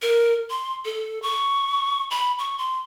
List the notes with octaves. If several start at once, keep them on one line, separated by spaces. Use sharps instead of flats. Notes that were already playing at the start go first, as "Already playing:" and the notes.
A#4
C6
A4
C#6
B5
C#6
C6